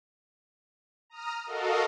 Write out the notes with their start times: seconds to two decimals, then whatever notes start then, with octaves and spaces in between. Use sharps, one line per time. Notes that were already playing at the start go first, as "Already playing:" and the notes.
1.10 A#5 D#6 F6
1.46 F#4 A4 A#4 D#5 F5